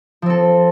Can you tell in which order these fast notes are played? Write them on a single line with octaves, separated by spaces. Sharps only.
F3 C4 A4